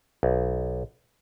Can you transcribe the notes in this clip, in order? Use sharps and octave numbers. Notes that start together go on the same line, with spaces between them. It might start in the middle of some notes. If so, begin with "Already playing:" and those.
B1